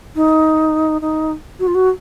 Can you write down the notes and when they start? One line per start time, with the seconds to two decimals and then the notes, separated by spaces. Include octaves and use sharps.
0.15 D#4
1.01 D#4
1.59 F#4
1.67 F4
1.74 F#4